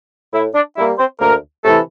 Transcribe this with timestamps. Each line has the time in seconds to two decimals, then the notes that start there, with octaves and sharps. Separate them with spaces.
0.33 A2 E4
0.54 D4
0.77 G3 A#3 E4
0.98 C4 C5
1.20 D2 A#3 A#4
1.64 C3 E3 A3 A4